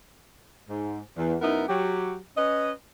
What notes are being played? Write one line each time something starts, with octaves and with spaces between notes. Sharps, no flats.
G#2
E2
F#2 B3 D#4 E4 A#4
F#3 G4
C#4 B4 D#5